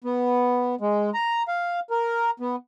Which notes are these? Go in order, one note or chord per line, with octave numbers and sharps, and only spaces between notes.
B3
G#3
A#5
F5
A#4
B3